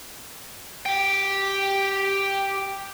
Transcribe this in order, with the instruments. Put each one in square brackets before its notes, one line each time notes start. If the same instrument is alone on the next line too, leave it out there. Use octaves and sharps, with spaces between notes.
[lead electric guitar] G4 G5